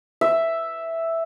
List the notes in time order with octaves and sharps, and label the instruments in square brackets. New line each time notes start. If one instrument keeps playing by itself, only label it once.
[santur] E5